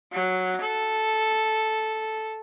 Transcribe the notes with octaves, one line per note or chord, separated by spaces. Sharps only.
F#3
A4